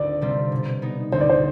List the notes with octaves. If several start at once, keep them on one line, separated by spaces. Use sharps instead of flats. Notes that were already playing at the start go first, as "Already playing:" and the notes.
Already playing: D2 D5
C3 G3 C4 F4
B2
B3 D#4
D2 C5
D5
C5